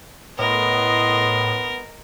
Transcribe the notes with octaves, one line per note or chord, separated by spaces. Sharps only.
A2 B3 A#4 D#5 C6